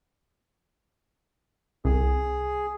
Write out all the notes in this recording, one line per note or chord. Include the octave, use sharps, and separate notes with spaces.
C2 G#4